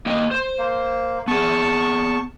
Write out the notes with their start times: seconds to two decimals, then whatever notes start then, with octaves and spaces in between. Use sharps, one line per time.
0.06 A#3 D#5 G5
0.31 C5
0.58 A#3
1.28 B3 G#4 A5 C#6